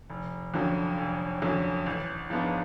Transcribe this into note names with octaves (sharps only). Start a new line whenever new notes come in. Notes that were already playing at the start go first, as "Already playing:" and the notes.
F1
F2 D3 F#3 C#4
F1
F2 D3 F#3 C#4
A1
G#2 F3 B3 D4